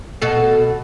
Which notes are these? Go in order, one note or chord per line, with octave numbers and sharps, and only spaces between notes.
B2 F#4 A4